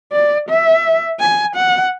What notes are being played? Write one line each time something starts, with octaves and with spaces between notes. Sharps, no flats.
D5
E5
G#5
F#5